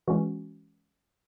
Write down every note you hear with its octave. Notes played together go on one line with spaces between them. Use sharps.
E3 G#3 C#4 F#4